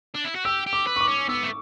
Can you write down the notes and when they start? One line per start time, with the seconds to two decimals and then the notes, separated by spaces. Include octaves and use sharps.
0.14 D4
0.24 E4
0.35 F#4
0.45 G4 E6
0.66 G4
0.73 D6
0.87 B4
0.96 C#6
1.01 D6
1.08 C#4
1.29 B3 E6
1.43 A3